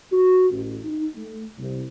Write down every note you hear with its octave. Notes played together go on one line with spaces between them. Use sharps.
F#4
A1
D#4
A3
C2